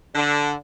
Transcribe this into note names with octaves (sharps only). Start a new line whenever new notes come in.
D3